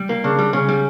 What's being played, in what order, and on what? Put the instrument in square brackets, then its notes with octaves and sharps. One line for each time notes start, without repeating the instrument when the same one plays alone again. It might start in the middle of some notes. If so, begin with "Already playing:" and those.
Already playing: [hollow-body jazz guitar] G3
A#3
[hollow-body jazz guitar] C#3 [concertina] D4
[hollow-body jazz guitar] G3
[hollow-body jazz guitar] C#3 [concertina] C#4
[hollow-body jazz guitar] G3